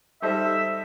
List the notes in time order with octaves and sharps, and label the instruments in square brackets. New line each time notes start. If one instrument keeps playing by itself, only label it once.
[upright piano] G3 D#4 A4 C5 D#5 [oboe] E5